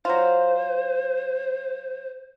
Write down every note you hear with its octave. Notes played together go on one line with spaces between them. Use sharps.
F#3 F4 C5